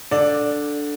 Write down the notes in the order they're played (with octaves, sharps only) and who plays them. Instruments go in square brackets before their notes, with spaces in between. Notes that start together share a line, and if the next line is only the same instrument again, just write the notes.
[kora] D3 [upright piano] D5